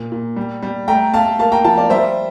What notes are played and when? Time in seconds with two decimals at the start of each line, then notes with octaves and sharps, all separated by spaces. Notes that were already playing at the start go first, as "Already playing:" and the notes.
Already playing: A#2
0.12 A#2
0.36 G3
0.63 G3
0.88 A3 G5 A#5
1.14 A3 F5 A5
1.39 A#3 F5 A5
1.52 G5 A#5
1.65 F3 F5 A5
1.77 D5 F5
1.90 G3 C5 E5